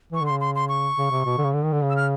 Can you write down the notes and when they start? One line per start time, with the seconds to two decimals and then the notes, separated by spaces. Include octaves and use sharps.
0.12 E3 C#6
0.21 D3
0.26 C6
0.31 C#3
0.41 C6
0.55 C6
0.69 C#6
0.97 C#3
1.11 C3
1.26 B2
1.38 D3
1.44 C#3
1.54 D3
1.64 D#3
1.72 D3
1.82 C#3
1.90 E6
1.96 F6